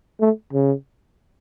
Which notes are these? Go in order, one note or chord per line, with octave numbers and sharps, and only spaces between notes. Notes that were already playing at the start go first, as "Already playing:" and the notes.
A3
C#3